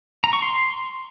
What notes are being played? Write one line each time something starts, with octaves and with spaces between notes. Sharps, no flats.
A#5
C#6
C6